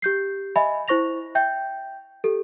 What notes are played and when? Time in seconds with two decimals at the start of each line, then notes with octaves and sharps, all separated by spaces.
0.02 G4 G6 C7
0.56 D#5 E5 G#5 B5
0.88 E4 C5 C#6 A#6 F7
1.35 E5 G5 G6
2.24 G4 A4